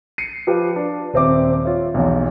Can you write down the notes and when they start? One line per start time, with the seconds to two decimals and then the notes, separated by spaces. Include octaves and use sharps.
0.18 C7 C#7 D#7
0.47 F3 G4 B4 F5
0.76 D4
1.14 D#1 C4 E5 D6
1.65 F4 C#5 E5
1.94 B1 E2